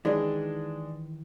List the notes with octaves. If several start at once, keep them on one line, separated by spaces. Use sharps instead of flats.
D#3 E3 G#3 D4